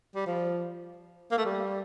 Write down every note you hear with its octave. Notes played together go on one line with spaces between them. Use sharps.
G3
F3
A#3
A3
G3